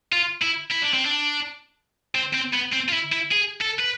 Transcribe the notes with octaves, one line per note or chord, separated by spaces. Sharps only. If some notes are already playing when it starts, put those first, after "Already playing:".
F4
E4
E4
D4
C4
D4
C4
C4
B3
C4
F4
E4
E4
G#4
A4
B4